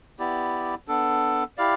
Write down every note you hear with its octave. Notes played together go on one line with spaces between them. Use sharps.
B3 E4 G4 D5
B3 D4 A4
E4 G4 D5 F5